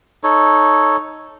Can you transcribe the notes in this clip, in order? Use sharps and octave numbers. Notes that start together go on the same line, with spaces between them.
D#4 A4 C#5